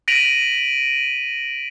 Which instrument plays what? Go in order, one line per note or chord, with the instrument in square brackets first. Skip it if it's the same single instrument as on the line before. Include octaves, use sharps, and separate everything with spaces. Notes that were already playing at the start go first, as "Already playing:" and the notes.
[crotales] A#6 B6 D7 D#7 F7 F#7